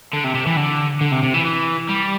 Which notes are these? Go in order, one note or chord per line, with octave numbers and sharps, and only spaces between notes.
D3
C3
C3
E3
D3
D3
C3
C3
E3
E3
G3